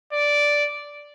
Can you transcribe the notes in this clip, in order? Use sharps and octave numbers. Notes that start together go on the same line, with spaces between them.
D5